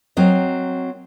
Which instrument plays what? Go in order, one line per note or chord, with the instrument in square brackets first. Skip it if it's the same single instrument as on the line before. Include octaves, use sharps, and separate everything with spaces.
[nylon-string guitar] F#3 C4 A#4 D#5